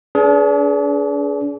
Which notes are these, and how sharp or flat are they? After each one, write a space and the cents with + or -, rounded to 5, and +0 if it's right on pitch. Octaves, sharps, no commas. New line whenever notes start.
D4 -40 G#4 +30 B4 -5